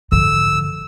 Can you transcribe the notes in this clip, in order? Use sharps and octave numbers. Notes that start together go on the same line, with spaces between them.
G#2 D3 F3 E6